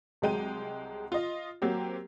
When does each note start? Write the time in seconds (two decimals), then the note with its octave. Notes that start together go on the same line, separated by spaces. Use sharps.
0.22 C2 F#3 G#3 G5 D#7
1.12 F4 D#5
1.62 F#3 A#3 C4 G4